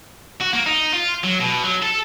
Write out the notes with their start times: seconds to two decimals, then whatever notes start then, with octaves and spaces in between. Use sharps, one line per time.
0.41 F#4
0.53 A#3
0.66 D#4
0.93 F4
1.24 F#3
1.40 B2
1.64 F#3
1.83 A4